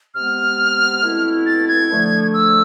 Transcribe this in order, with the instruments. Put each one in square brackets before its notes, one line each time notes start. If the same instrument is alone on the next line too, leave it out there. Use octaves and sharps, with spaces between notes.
[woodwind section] C3 G#3 B3 [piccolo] F6
[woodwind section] B2 A3 C4 E4
[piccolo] A6
G#6
[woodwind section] D3 F3 A3
[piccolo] E6